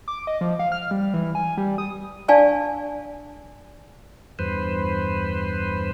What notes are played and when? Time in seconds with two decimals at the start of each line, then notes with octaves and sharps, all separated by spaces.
0.08 D6
0.27 D#5
0.41 F3
0.59 F5
0.72 F6
0.91 G3
1.14 E3
1.35 G#5
1.57 G3
1.78 D#6
2.28 D4 D5 F5 G#5 A5 C#6
4.39 E2 G2 B4 C5